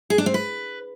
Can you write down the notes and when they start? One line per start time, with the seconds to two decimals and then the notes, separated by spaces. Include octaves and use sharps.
0.10 G#4
0.18 D4
0.26 C4
0.34 B4